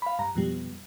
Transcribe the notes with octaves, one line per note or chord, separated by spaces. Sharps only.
F5 B5
G2 A#5
F2 B2 G3